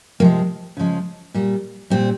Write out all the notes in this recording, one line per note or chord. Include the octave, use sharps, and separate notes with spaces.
C3 F3 G#3 A#3
C#3 F3 G#3
A#2 G3
A#2 G3 C4